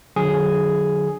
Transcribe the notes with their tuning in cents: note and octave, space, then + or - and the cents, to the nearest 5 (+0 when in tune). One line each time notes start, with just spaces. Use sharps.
D3 +10 F#3 -30 G#4 +0